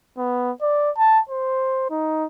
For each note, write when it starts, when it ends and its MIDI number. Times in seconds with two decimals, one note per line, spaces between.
0.18 0.51 59
0.62 0.91 74
0.98 1.19 81
1.29 1.87 72
1.91 2.26 63